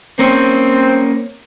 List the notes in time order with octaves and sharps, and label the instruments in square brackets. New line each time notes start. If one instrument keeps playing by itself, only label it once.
[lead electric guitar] A#3 C#4 [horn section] C4